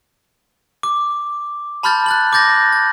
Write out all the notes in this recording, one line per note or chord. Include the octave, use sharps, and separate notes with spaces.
D6
A5 B5 C6 F6 G6 A6
F#6 A6 F#7
D6 F#6 G6 A6 A#6
A6